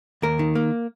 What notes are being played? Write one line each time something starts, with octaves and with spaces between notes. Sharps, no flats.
D#2 A#4
D#3
A#3